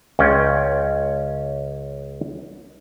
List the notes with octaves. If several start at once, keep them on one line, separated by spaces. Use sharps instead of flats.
C#2 C#4 D5 G5